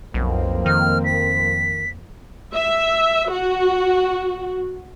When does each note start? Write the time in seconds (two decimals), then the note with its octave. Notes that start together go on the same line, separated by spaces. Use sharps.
0.14 B1 F2 A#3 C4
0.66 D#3 F6
1.05 B6
2.55 E5
3.32 F#4